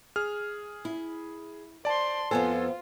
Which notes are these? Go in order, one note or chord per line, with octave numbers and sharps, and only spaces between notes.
G#4 F6
E4
C5 D5 A5 C6
F2 B3 F4 A4 C5 G#5